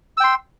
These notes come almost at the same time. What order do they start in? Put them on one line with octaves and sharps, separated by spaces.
E6 G5 C6